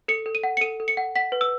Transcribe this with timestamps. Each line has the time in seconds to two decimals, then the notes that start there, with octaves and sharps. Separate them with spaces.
0.08 A4 C#7
0.26 A4
0.35 D#7
0.43 F#5
0.57 C#7
0.61 A4 D#7
0.80 A4
0.88 C#7
0.97 F#5
1.16 F#5 B6
1.32 B4
1.41 E6